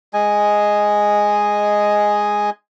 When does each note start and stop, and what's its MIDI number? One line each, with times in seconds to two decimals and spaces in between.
0.14 2.50 56
0.14 2.50 75
0.14 2.50 80